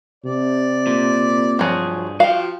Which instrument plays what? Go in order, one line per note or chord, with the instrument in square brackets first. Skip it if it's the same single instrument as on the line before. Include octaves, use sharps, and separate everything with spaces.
[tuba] C3 [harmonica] D5
[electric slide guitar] A#2
[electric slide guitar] G2 G#4 [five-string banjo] F3 F#3
[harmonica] F3 [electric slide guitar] F#4 G5 [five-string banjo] F5